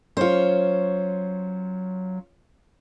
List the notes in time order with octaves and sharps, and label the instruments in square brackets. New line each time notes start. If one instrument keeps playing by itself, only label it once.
[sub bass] F#3 [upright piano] C#4 F4 [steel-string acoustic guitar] C5 C#5